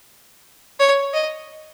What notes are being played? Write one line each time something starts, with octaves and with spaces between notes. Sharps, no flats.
C#5
D#5